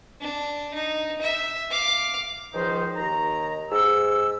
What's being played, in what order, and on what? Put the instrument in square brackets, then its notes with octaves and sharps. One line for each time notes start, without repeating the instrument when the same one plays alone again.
[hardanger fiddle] D4
D#4
E5
F5 D6
[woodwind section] C#2 D#3 F3 D#4 C5
D#2 D#3 A#5
G#2 E6